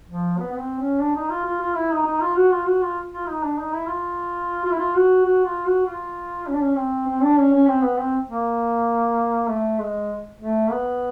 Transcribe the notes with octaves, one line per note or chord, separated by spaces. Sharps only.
F3
B3
B3
C4
C#4
D4
D#4
F4
F4
F4
E4
D#4
D#4
F4
F#4
F4
F#4
F4
F4
D#4
D4
D#4
E4
F4
F4
E4
F4
F#4
F#4
F4
F#4
F4
C#4
D4
C#4
C4
C4
D4
C#4
C#4
C4
B3
C4
A#3
A3
G#3
A3
B3